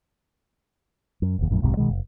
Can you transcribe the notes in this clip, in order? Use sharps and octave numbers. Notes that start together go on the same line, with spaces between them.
F#2
F1 D#2
A#1 F#2 A2
D#1 B1 G#2 C3
C2 B2 D#3 G#3
F#1